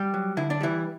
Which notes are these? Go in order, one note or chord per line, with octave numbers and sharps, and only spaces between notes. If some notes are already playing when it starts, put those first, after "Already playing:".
Already playing: G3 G4
F#3
D3 E4
D4
E3 G3 E4